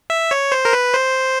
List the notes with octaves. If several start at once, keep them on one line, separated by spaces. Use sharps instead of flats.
E5
C#5
C5
A#4
B4
C5